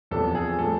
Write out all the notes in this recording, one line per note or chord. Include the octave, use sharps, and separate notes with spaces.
E2 C3 F3 A4
G#4
A2 F3 A4